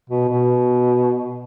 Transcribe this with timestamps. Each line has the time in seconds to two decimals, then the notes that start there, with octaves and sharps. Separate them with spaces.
0.10 B2
0.29 B2